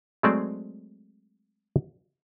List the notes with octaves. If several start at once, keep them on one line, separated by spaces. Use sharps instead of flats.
F#3 G#3 A3 C4 C5 D5